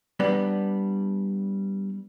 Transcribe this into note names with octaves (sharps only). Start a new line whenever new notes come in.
G3 B3 D4